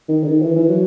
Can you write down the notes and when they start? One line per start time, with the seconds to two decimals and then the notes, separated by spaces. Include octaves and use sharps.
0.08 D#3
0.23 D3
0.28 D#3
0.42 E3
0.56 E3
0.69 F#3